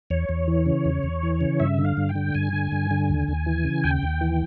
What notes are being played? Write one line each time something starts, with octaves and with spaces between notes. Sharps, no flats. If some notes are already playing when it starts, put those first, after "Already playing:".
E2 C#5
E2
E3
C#3
E2
E2
E3
C#3
G2 E5
D3
F5
G2
G5
D3
G2 G#5
D3
G2
D3
D#2
D#2
E3
C#3
D#2 G5
D#2
E3